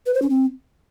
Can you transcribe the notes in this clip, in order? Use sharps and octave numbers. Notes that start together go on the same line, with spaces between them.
B4
C5
C#4
C4